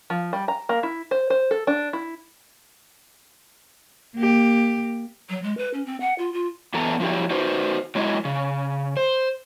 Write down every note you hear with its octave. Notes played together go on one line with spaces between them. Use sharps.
F3
G3
A#5
A#3
E4
C5
C5
A4
D4
E4
A#3 G4
F#3
G#3
B4
C#4
C4
F#5
F4
F4
F#2 E3 B3 A4 A#5
F3 F#3 D#4 E4 G4
D#4 F#4 B4 C5
F#3 G#3 E4 D#5
C#3
C5